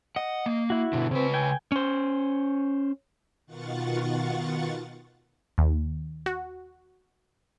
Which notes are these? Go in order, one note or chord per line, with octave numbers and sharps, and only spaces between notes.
D#5 F#5
A#3
E4 F#4
B2 D3
C#3 C4 B4
G5 G#5
C#4 C5
B2 D#3 F4 F#5 C#6 A6
D#2
F#4